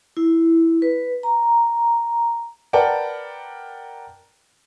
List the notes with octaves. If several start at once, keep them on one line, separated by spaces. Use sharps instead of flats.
E4
B4
A#5
A#4 B4 D5 F#5 G5 A5